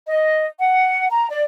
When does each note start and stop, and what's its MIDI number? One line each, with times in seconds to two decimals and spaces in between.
0.08 0.45 75
0.59 1.08 78
1.11 1.28 82
1.31 1.45 74